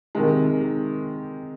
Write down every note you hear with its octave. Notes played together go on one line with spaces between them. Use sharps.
C3 D#3 G#3